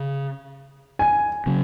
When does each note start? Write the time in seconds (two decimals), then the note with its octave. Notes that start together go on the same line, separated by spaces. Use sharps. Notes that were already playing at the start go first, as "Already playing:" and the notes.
Already playing: C#3
0.99 G#5
1.46 C#3 F#3 C#4